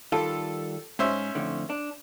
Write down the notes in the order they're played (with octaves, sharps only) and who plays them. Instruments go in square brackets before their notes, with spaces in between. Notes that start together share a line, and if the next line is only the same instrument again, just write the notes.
[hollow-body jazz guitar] D#3 G3 F4 [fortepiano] A4
[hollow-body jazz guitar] G#2 [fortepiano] C#4 C5 E5
[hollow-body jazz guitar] F2 A2 D3
D4